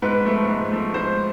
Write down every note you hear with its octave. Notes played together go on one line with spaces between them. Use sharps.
G#2 B4
F3 A3
G#2
F3 A3
G#2 C5